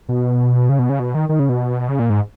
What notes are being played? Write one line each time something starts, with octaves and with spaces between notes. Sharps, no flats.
B2
C#3
B2
C#3
B2
D#3
D#3
C#3
B2
C#3
A#2
G#2